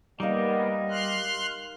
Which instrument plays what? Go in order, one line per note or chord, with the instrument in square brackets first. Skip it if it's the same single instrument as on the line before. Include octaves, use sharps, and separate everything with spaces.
[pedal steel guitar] G3 [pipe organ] A#3 B3 [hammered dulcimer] D#4 A#4 F5 [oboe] D#5
[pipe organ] C6 F6 F#6